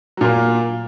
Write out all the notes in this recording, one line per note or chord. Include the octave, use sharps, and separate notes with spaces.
A#2 F#3 A#3